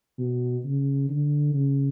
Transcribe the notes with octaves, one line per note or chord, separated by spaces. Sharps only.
B2
C#3
D3
C#3